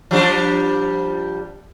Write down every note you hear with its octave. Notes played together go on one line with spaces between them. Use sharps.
F3 G3 D4